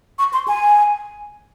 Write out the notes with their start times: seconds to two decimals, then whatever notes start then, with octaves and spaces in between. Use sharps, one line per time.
0.19 C#6
0.33 C6
0.48 G#5